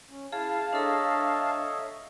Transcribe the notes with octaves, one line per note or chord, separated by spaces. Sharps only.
C#4
E4 G#4 F5 A5
D4 A4 C#5 D#5 E5 A#5